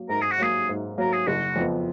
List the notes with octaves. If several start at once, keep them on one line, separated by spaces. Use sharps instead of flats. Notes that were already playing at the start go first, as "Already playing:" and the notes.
Already playing: F#3 A#3
G#2 A#4
G#4
F#4
F#3 A#3 G#4
G#2
F#3 A#3 A#4
G#4
F#1 F#4
F2 F3 B3